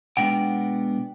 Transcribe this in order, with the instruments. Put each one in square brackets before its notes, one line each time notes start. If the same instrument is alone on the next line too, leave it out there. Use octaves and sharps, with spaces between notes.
[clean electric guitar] B2 G#3 B3 D4 G5